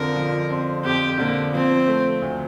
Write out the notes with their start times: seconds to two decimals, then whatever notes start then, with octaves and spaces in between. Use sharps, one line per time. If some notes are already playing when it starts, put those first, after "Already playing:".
Already playing: F2 D3 F3 C4 A#4
0.16 F3
0.50 C4
0.85 F2 G4
1.19 D3 A#3
1.53 F3 C4
1.88 A3
2.22 D2